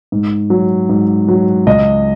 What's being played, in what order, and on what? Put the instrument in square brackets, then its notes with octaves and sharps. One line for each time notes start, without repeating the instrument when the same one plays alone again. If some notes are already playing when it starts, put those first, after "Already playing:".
[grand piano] G#2
F#3
G#2
F#3
C#2 D#5